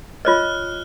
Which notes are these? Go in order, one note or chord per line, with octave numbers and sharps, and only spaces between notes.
F4 C#5 D#5 F6 F#6